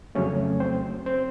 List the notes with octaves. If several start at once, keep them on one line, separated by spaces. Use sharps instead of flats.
F2 C#3 F#3 A3 C#4 C#5
C4 C5
C4 C5